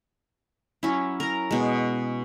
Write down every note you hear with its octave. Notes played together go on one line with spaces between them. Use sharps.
F#3 C#4 E4
A#4 A#5
B2 G#3